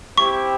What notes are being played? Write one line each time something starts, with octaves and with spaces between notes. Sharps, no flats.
C4 E4 G4 C#6